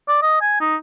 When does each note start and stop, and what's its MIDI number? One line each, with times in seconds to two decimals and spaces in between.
0.08 0.19 74
0.22 0.40 75
0.41 0.56 80
0.60 0.76 63